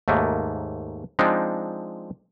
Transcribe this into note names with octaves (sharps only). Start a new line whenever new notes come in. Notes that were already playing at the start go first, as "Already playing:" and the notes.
D#2 G#2 A3 A#3
F3 G#3 C4 D4 D#4